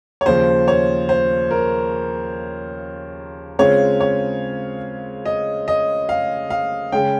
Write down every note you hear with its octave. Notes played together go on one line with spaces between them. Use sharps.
C#5
D#2 C#3 F3 C5
C#5
C5
A#4
C#3 G#3 C4 F4 C#5
C#5
D#5
D#5
F5
F5
C#3 G#3 C#4 G5